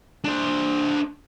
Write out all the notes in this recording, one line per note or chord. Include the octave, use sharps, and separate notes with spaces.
D4 C5